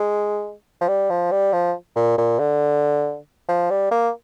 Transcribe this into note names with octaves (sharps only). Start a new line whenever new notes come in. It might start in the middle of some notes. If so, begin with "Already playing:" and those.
Already playing: G#3
F3
G3
F3
G3
F3
A#2
A#2
D3
F3
G3
A#3